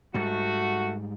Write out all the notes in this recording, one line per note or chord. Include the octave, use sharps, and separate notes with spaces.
G#2 G3 A3 F#4